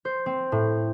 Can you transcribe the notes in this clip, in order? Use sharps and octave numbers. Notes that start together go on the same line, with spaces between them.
C5
C4
A2